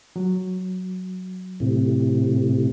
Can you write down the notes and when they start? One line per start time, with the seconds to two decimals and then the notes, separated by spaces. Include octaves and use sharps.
0.16 F#3
1.60 A2 C3